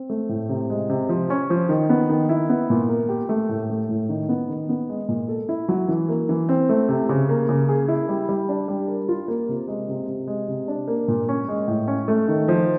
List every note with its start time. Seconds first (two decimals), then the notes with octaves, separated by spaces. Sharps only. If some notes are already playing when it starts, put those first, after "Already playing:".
Already playing: C4
0.10 A3
0.29 A2
0.49 C3
0.70 G#3
0.89 C3
1.09 F3
1.30 C#4
1.50 F3
1.69 D#3
1.89 B3
2.09 D#3
2.29 E4
2.49 B3
2.70 A#2
2.89 A#4
3.09 G4
3.29 A3
3.49 A2
3.70 A3
3.89 A2
4.09 D#3
4.29 B3
4.49 D#3
4.69 B3
4.89 G#3
5.08 A#2
5.28 A4
5.49 E4
5.68 F#3
5.88 E3
6.09 A#3
6.29 E3
6.49 C4
6.69 A3
6.89 C3
7.09 C#3
7.29 A#3
7.49 C#3
7.69 G#4
7.88 E4
8.09 G3
8.29 G3
8.49 D4
8.68 G3
8.88 A#4
9.08 F4
9.28 A#3
9.49 C3
9.68 G#3
9.88 C3
10.08 C3
10.27 G#3
10.48 C3
10.68 D4
10.88 A#3
11.08 A#2
11.29 C#4
11.48 G#3
11.68 A2
11.88 C#4
12.08 A3
12.28 D#3
12.48 F3